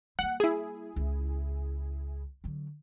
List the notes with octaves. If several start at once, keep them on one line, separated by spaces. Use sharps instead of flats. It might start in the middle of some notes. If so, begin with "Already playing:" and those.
G3 A#3 F#5
E4 G#4
C#2
D3 F#3